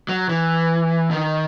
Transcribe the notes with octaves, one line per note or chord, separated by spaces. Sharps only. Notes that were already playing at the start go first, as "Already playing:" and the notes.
F#3
E3
D#3